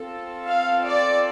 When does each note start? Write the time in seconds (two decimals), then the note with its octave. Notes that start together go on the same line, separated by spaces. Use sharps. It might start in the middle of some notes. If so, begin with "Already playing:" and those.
Already playing: C4 F4 A4
0.47 F5
0.86 D5